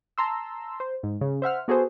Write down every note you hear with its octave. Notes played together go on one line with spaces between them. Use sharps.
A5 A#5 C6 E6
C5
G#2
C#3
C5 E5 F#5 F6
B3 F#4 G#4 A4 C5